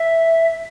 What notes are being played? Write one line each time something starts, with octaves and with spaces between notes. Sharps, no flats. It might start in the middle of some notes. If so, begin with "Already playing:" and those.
Already playing: E5